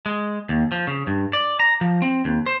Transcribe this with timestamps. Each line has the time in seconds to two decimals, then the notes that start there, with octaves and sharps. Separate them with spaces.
0.06 G#3
0.49 D#2
0.72 F3
0.87 C#3
1.07 G2
1.33 D5
1.60 A#5
1.81 F3
2.02 C4
2.25 D#2
2.46 C5